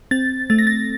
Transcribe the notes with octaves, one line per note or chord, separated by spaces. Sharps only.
C4 A6
A3 A6
A#6
A6